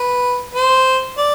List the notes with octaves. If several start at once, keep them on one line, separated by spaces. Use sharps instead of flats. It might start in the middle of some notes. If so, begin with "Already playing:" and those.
Already playing: B4
C5
D5